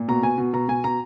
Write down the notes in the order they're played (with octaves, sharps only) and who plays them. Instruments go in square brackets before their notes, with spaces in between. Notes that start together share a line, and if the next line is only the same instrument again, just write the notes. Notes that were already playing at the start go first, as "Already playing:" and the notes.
Already playing: [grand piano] A#2
B2 A#5
B2 G#5
B2
B2 A#5
B2 G#5
B2 A#5